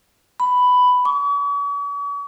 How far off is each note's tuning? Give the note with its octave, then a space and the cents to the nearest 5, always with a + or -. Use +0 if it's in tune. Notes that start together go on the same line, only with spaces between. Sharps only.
B5 +10
C#6 +45